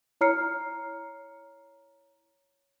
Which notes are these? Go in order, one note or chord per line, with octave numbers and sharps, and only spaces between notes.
E4 C#5 A#5 F6 C7 C#7